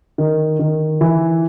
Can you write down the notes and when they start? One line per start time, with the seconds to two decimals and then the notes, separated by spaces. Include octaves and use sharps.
0.18 D#3
0.59 D#3
1.01 E3